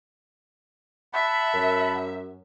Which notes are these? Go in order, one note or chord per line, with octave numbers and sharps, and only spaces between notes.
E5 F#5 A5 B5
F#2